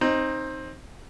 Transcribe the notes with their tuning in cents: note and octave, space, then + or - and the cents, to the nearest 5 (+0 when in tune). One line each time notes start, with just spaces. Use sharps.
C4 +20 D#4 +0